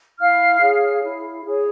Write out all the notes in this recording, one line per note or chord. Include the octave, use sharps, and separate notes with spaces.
E4 F5 F6
G#4 C#5
E4
G#4 C#5